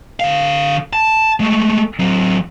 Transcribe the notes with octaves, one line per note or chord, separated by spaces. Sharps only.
D3 F5
A5
G#3 A3
F#3 C4